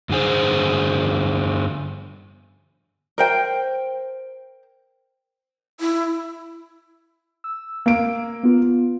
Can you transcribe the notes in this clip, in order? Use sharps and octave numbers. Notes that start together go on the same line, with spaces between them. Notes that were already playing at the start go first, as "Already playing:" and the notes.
G2 D3 G#4 C5
A#4 C5 G5
E4
E6
A#3 D7
B3 F4